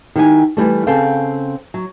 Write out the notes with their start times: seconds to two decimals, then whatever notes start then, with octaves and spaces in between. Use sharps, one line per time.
0.16 D#3 E4 G4 G#5
0.57 E3 G3 A3
0.87 C#3 C4 A4 F5 G5 A5
1.74 F#3